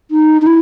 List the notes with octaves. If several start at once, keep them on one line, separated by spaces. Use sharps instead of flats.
D#4
D#4
E4